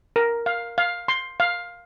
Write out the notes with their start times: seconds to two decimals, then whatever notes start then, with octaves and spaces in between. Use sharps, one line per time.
0.16 A#4
0.46 F5
0.78 F5
1.08 C6
1.40 F5